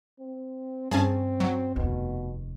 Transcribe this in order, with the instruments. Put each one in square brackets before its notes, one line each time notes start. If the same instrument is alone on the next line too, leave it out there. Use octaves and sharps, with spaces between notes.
[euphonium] C4
[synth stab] G2 C#4 [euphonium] C4 [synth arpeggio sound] G#4 G#5 A5
[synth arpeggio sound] F#3
[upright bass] F1 D#2 [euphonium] B2